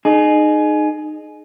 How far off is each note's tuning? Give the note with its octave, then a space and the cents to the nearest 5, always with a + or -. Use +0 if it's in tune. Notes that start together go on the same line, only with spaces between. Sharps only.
D#4 -25 G#4 +20